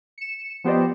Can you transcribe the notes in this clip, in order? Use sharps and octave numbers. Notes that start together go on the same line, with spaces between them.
C#7 E7
F3 B3 G4 C5 D5 D#5